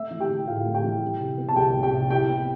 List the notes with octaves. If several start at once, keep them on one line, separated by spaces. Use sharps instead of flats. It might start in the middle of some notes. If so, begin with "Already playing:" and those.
Already playing: A3 E5 E6
E3
G4 G5
E4
A2 F4 F5
A3
G4 G5
E3
G3
C3
B3
A5
C2 G4 G5
G3
G4 G5
C3
E4 G4 G5
B3